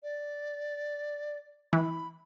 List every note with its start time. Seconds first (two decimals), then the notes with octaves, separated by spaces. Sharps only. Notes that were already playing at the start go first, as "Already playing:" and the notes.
0.03 D5
1.73 E3 B5